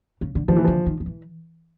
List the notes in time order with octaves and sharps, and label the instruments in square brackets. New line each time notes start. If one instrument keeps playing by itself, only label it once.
[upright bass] C#3
D3
[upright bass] D#3 [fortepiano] F3
[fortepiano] E3
[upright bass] D3 [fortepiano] F3
[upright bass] D#3
D#3
E3